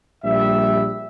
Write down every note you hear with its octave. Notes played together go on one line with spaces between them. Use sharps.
A#1 G3 E5